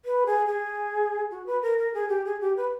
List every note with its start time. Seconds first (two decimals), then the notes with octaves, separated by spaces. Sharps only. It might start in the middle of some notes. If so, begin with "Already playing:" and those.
0.05 B4
0.26 G#4
0.47 G#4
1.31 F#4
1.46 B4
1.63 A#4
1.78 A#4
1.94 G#4
2.09 G4
2.25 G#4
2.41 G4
2.57 B4